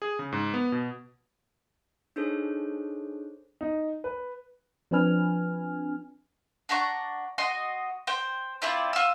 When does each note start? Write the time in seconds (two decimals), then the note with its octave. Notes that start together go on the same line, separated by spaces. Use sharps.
0.02 G#4
0.19 C#3
0.32 G#2
0.54 B3
0.72 B2
2.16 D4 D#4 G#4 A4 C5 C#5
3.61 D#4
4.04 B4
4.91 F3 C4 D4 B4 G#5 F6
6.69 D4 F#5 A#5 C#6
7.38 F#4 D#5 C6
8.07 C5 G5
8.62 C4 E4 F4 D5
8.93 F4 E6